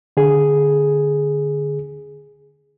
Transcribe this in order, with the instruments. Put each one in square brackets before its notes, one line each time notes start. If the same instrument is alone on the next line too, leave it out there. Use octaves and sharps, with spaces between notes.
[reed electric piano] D3 G#4